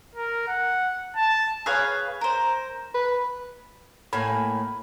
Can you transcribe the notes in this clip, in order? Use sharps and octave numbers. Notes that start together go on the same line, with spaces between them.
A#4
F#5
A5
G#4 B4 C#5 F5
A#4 C5
B4
A2 A#3 G#5 B5